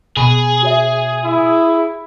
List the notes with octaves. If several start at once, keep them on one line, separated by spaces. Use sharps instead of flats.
B2 G#4 B5
F#4 C#5 E5
E4